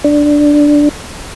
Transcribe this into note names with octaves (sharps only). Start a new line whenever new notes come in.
D4